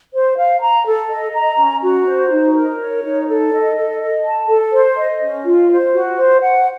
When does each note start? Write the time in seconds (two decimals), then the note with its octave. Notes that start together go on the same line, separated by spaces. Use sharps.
0.14 C5
0.37 F5
0.61 A#5
0.86 A4
1.10 D#5
1.34 A#5
1.59 C#4
1.83 F#4
2.06 C5
2.30 D#4
2.56 A#4
2.79 C#5
3.03 D#4
3.28 A4
3.52 D#5
3.76 A4
4.00 D#5
4.23 A5
4.47 A4
4.72 C5
4.96 D#5
5.20 C#4
5.44 F4
5.69 C5
5.93 F#4
6.17 C5
6.41 F#5